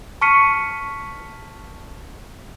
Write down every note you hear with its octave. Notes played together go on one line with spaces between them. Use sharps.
A5 C#6 F6 B6 C#7 D#7